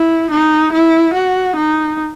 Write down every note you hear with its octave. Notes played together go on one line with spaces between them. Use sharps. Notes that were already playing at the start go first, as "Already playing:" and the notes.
Already playing: E4
D#4
E4
F#4
D#4